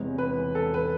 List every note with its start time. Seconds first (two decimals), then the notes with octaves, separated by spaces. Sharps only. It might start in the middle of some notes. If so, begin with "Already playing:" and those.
Already playing: E1 E2 C3 G#3
0.18 B4
0.55 A4
0.74 B4